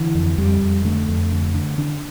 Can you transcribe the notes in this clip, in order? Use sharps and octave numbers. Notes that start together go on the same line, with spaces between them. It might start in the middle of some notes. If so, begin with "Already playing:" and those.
Already playing: D3 E3
F2
F2 G3
F2
D3 A3
F2
D3
D3
D3 D4